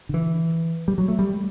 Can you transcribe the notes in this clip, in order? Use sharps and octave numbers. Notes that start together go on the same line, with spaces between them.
D3
E3
G3
F#3
A3
G3